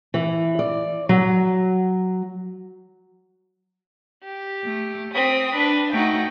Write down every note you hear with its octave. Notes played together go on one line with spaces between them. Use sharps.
E3
D5
F#3
G4
A3
C4 D#6 B6
D4 B4
A3 D#4 F#4 G5